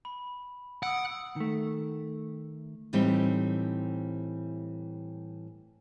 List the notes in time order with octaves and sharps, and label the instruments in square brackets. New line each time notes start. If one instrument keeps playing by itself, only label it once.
[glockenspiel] B5
[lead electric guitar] F#5 [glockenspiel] D#6 E6 D7
[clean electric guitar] D#3 A3
[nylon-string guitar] A2 E3 G3 C4 D#4